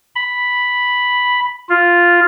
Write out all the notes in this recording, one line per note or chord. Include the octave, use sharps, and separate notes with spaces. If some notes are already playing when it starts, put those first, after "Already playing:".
B5
F4